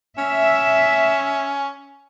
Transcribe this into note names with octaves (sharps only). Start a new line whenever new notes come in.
C#4 E5